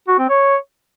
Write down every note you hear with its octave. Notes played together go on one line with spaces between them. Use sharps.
F#4
C4
C#5